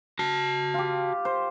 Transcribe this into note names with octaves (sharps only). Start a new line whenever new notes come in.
F#4 A5
F4 G4
C5